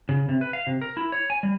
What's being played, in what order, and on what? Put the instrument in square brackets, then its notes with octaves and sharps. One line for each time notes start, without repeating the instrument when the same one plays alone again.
[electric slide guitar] C#3
C3
B4
F5
C3
A#4
E4
C#5
G#5
G3